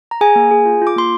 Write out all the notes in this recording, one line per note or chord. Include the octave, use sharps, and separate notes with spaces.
A#5
G#4 G#5
A#3
G#4
F4
F4
D6
A#3 C6